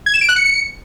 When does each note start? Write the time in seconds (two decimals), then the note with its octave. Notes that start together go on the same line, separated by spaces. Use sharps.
0.06 G#6
0.14 E7
0.21 D7
0.29 F#6
0.36 C#7